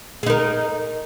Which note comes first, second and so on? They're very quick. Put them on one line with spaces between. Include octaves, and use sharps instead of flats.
G#4 D#4 A#4